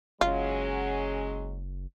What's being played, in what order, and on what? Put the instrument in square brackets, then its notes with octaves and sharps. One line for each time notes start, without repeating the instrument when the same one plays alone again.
[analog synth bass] F#1 [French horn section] F#3 G#3 C#4 [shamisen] F4